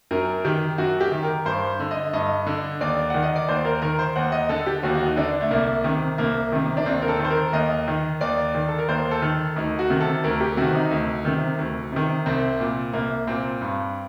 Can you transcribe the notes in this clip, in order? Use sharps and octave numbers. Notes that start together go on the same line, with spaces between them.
F#2 A#4
D#3 G4
F#2 F#4
G4
D#3
A#4
G2 C5
D3
D#5
G2 D#5
D3
D#2 D5
D#3 F#5
D#5
D5
D#2 C5
A#4
D#3 A#4
C5
D#2 F#5
D#5
D3 A4
G4
D#2 F#4
F#4
D#4
D3 D4
A3
C2 A#3
C3 D#3
C2 A#3
C3 D#3
D4
D#2 C4
A#4
A4
D#3 C5
A#4
D#2 D#5
D#3
D#2 D5
D#3
A4
A#4
D#2 C5
A4
D#3
D2 D#4
F#4
C3 D#3
A4
D2 A#4
G4
C3 D#3 F#4
D#4
D2
C3 D#3
D2
C3 D#3
C2 C4
A#2
C2 A#3
A#2 C4
G2